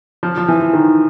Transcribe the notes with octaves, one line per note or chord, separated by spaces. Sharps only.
F3
F3
E3
D#3